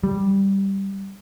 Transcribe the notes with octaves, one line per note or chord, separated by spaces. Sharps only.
G3